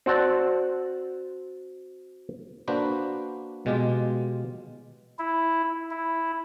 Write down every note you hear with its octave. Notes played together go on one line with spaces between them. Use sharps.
C4 F#4 D5 A5
A#3 D4 F#4 B4 C5
B2 G#3 F4 G4
E4
E4